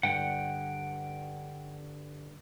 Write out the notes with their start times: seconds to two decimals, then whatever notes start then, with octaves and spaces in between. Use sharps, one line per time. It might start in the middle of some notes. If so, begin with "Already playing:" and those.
0.03 G2 D3 F#5 G5